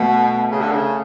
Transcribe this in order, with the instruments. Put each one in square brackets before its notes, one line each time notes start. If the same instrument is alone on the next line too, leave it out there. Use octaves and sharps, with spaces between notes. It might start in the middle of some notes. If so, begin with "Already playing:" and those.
Already playing: [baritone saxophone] B2 [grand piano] A3
[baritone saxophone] C#3
D3
C#3